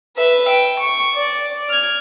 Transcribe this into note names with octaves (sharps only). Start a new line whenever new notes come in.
B4 E5
G5
C#6
D5
F6 G#6